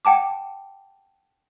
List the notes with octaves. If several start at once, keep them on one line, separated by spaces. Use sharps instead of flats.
F#5 G5 A5 D6